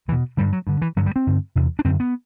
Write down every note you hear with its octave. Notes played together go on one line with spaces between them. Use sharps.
E2 B2 E3
G2 D3 G3
F#3
G2 D3
E3
G2 D3 F#3
G3
C4
G2 D3
E2 C3
D4
F#2 D3 C4
B3